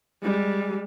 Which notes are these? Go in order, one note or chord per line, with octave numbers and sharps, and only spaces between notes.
G3 G#3